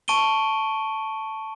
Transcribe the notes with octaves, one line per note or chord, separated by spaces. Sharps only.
A5 C#6 D7 D#7 G7